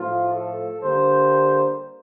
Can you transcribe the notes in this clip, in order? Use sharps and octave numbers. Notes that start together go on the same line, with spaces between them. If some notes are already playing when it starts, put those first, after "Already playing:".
Already playing: A2 F3 A3 F4
A4
D3 G3 A#3 C5